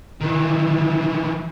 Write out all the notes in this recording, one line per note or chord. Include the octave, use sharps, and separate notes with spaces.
D#3 E3